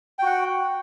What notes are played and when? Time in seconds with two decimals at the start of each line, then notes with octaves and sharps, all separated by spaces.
0.19 G5
0.22 F#4
0.26 F#5